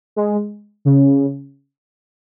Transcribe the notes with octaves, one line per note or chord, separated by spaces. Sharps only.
G#3
C#3